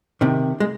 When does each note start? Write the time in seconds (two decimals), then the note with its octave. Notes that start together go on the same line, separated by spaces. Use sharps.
0.21 C3 D#3
0.60 G#3